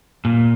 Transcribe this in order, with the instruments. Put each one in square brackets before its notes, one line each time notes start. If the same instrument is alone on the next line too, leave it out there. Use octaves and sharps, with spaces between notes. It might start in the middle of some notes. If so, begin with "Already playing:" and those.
[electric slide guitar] A#2